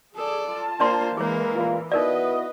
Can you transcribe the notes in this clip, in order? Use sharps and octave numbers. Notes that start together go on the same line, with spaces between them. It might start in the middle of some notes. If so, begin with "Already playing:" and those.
G#4 A4 D5
F4 A5
A#3 D4 C5 D5 C6
E3 G#3 A#3 G#4 A#4 C#5
A1 A#2 F4
B3 D#4 E4 F#4 A#4 B4 D5 D#5